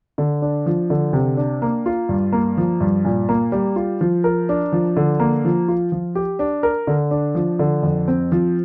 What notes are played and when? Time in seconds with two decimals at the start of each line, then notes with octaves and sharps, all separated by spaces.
0.18 D3
0.42 D4
0.66 F3
0.90 D3
1.13 C3
1.37 D4
1.62 A#3
1.86 F4
2.09 G2
2.32 A#3
2.57 F3
2.81 G2
3.05 A#2
3.29 A#3
3.52 G3
3.76 F4
4.01 F3
4.24 A#4
4.49 D4
4.72 F3
4.97 D3
5.20 A#3
5.45 F3
5.68 F4
5.92 F3
6.15 G4
6.39 D4
6.63 A#4
6.87 D3
7.11 D4
7.35 F3
7.59 D3
7.83 F2
8.08 C4
8.32 F3